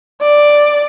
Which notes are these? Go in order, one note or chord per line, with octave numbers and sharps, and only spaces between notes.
D5